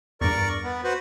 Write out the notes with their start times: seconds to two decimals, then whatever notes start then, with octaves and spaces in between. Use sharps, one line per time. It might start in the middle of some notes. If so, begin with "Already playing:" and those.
0.21 E2 G2 A#4 D5 C#6
0.64 B3
0.84 F#4 B4 C5